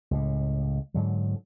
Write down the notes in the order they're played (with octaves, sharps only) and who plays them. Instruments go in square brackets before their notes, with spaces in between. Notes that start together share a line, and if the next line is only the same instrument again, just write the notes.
[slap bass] C#2 A2
G#2 D3 F#3